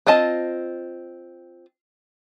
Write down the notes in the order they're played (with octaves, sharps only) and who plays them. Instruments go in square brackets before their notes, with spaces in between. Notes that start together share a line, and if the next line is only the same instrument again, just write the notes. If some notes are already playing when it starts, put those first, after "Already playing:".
[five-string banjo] C4 F4 D#5 A5